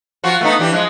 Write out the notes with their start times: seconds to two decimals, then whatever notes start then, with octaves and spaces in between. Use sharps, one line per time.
0.24 F3 F4 F#4
0.41 A3 B3 D#4
0.59 E3 D4 G4
0.72 F3 G#3